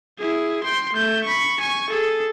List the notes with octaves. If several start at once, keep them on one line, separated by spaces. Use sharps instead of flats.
E4 G#4
G5 C6
A3 G6
B5 C#6
G#5 C#6
G#4 A4